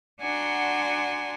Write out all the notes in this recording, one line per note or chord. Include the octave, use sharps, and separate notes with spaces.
D4 F#4 F#5 G#5 A#5 C6